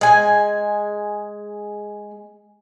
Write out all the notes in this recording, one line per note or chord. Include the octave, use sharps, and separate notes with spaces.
G#3 G#5